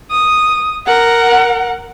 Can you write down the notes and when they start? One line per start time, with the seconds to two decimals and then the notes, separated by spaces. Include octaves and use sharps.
0.11 D#6
0.86 A#4 F#5